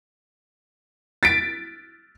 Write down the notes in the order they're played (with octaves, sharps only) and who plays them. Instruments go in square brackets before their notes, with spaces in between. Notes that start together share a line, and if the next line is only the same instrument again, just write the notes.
[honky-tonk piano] A6 B6 D7